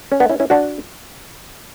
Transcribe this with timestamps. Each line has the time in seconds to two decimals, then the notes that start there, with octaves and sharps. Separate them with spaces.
0.12 C#4
0.20 B3 D4
0.29 C#4 E4
0.40 C#4 E4
0.50 D4 F#4